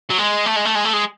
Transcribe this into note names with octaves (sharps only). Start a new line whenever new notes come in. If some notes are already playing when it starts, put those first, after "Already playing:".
F#3
G#3
A3
G#3
A3
G#3
A3
G#3